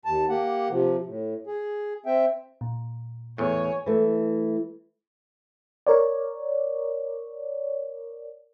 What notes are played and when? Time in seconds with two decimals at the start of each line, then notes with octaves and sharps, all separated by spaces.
0.05 D#2 A5
0.29 A#3 G4 F#5
0.70 C3 F3
1.06 A2
1.47 G#4
2.06 C4 E5 G5
2.61 A#2
3.38 E2 A2 C#5 G#5
3.86 E3 A3
5.87 A#4 C#5 D5